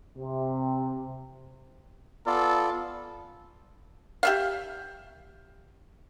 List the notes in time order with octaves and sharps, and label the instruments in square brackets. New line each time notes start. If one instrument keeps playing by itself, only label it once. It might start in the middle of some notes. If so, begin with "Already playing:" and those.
[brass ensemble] C3
[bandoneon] B3 F4 D5 [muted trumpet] A4
[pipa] G4 E5 F5